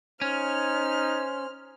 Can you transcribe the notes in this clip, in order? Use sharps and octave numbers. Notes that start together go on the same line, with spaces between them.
C#4 D#4 C5 F6